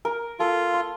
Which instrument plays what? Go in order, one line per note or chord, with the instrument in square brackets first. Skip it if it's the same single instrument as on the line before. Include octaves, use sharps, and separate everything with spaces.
[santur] A#4
[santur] A#3 A4 [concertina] F4
[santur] C6